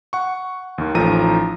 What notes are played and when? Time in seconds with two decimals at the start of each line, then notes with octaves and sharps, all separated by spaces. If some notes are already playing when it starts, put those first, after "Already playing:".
0.13 F#5 C#6
0.78 D#2 D#3
0.94 A1 F3 D#4 A4 A#5 D#7